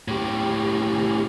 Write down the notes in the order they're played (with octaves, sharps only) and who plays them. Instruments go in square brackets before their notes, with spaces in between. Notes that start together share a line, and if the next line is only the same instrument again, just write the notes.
[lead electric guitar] A2 G4